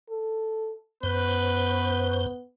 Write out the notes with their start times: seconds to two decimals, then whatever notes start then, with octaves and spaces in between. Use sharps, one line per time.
0.10 A4
1.03 F#2 B3 B4 C5